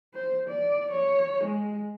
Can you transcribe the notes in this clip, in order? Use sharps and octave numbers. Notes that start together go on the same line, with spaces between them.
C5
D5
C#5
G#3